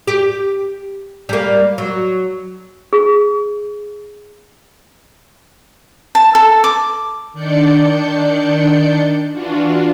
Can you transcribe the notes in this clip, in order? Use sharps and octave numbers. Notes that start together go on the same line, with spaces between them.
G4
G3 A#3
F#3
G#4
A5
A4
D6
D#3 D4 D5 G6 C#7
E3 D4 F4 F#4